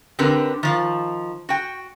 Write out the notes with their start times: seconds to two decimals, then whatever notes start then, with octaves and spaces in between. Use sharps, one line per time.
0.19 D3 C4 G4 A#4 B4
0.63 D#3 F3
1.49 F#4 G5